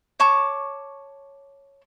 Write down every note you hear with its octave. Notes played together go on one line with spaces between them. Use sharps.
C#5 A5 C#6 D6